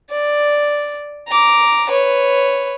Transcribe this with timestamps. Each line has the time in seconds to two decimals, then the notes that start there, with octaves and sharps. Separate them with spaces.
0.11 D5
1.28 A#5 D6
1.90 B4 C#5